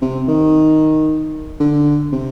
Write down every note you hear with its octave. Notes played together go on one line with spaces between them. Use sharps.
C3
D#3
D3
C3